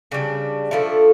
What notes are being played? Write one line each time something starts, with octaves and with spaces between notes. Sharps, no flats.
C#3 G3 D4
D3 F3 A3 E4